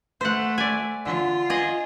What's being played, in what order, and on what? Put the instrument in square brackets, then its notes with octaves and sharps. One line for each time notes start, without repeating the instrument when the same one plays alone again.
[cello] A3 [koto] C5 F#5
[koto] D5 G#5
[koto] D3 [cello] F4
[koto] G#4 D#5